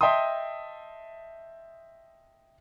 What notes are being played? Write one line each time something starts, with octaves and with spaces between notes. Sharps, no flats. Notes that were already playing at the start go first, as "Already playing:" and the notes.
D#5 E5 G5 A5 C6 D#6